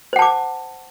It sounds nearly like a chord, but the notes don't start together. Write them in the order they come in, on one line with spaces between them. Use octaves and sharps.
C5 F#5 A5 D6